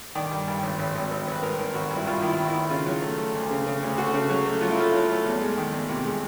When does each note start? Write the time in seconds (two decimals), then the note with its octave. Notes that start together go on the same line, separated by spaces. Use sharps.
0.15 D#3 D5
0.31 G2
0.48 G2
0.63 G#1
0.79 G#1
0.95 G#1
1.11 G#1
1.28 G#1 B4
1.43 G#1 A#4
1.59 D#3
1.75 G#1 F#4
1.91 G2
1.97 E4
2.06 G2 F4
2.22 D#3
2.28 E4
2.39 D#3
2.50 D#3 E4
2.70 C#3 F4
2.86 F#3
3.02 A3
3.18 A3
3.35 D2
3.51 C#3
3.66 C#3
3.83 D2
3.98 A3 F#4
4.14 C#3
4.30 F#3
4.46 A3
4.61 F#3 F4
4.71 E4
4.78 A3 F4
4.94 F#3
5.09 A3
5.25 E2
5.41 G#3
5.57 D#3
5.73 E2
5.89 C3
6.05 G#3